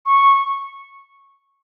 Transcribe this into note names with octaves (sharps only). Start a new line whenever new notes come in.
C#6